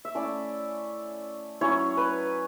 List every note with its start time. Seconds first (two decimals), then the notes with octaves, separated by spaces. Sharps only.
0.05 E5
0.15 A3 C#4 E4 D5
1.61 F#3 C#4 E4 C#5
1.97 B4